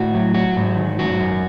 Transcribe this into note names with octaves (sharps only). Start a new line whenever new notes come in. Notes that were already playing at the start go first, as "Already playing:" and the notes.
Already playing: A2 F#4
F#3
F#3 F#4
G#2
D#3
F#3 F#4
F#2